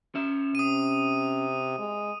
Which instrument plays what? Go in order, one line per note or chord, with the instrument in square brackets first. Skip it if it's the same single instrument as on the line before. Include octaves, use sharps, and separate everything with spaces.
[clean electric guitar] C#4 E5
[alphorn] C3 [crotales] D#6 D#7
[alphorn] G#3